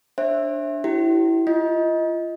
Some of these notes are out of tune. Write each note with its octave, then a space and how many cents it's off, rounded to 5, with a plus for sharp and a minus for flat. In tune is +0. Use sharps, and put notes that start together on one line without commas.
D4 -5 C5 +40 E5 +0
E4 +0 G4 -40
F4 -25 D#5 +15